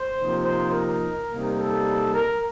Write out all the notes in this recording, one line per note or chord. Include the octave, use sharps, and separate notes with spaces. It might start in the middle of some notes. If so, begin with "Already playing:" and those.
Already playing: C5
C3 F3 A#3 D#4
C5
A#4
C3 G3 A#3 D#4
A4
A#4